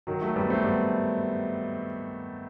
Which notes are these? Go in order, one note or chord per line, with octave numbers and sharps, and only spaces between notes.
D#3 F#3
F#3 A3
G3 B3
A3 C4
G3 B3